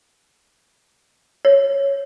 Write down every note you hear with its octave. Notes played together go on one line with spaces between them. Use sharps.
C#5